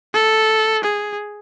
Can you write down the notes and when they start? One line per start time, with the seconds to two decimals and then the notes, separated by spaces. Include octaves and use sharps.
0.14 A4
0.83 G#4